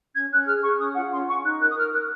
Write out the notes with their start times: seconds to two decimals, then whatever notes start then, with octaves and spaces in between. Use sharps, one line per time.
0.14 C#4 G#6
0.30 C#4 F#6
0.46 G#4 F6
0.63 G#4 C#6
0.79 C#4 D#6
0.95 F4 F#5
1.11 C#4 C6
1.27 C#4 C#6
1.43 D#4 F#6
1.59 A#4 F#6
1.69 D#6
1.75 A#4 F6
1.92 A#4 F#6